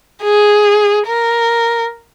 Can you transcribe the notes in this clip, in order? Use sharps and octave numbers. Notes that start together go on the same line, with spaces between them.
G#4
A#4